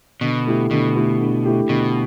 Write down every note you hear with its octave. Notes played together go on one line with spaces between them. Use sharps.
B2 D3
A3 E4 G4
B2 D3
A3 E4 G4
D3
A3 E4 G4
B2 D3